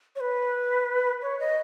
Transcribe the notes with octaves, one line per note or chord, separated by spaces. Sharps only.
C#5
B4
C#5
D#5